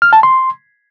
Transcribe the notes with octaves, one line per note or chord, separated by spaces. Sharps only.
F6
A5
C6